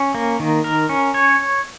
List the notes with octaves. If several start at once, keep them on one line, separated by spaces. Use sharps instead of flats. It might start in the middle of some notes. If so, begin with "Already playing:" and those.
Already playing: C#4
A#3
D#3
A#4
C#4
C#5